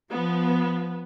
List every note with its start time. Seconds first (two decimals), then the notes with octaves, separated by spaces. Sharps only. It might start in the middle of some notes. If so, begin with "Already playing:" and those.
0.12 F3 B3